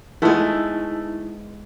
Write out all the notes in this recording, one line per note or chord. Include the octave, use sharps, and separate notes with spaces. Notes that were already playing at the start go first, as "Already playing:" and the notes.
E3 F3 G#3 A3 B3 D#4 E4